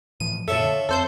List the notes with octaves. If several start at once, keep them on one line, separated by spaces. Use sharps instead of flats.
A2 E3 F3 D#7
F#2 A#2 F3 A4 C#5 E5
D3
F2 C4 A4 C5 G6